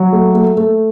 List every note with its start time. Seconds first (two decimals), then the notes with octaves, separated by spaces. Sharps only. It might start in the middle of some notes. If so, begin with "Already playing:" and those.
Already playing: F#3
0.12 A3
0.34 A3
0.57 A3